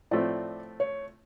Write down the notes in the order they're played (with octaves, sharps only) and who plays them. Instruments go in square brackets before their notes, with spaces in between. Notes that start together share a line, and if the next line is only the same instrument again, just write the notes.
[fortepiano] A2 F3 A3 C4 [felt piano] D5
[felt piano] C#5